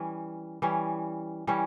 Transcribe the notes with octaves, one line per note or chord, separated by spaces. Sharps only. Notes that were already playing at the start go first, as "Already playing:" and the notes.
Already playing: E3 G3 C#4
E3 G3 C#4
E3 G3 C#4